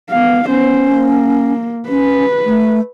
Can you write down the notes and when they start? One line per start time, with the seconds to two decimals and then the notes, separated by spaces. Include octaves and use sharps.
0.11 B3 F5
0.47 B3 C#4 C5
0.93 A#3
1.89 C#4 B4
2.45 A3